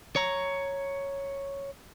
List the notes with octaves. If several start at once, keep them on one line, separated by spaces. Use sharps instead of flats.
C#5 A#5